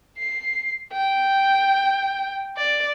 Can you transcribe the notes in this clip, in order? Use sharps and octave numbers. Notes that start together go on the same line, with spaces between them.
C7
G5
D5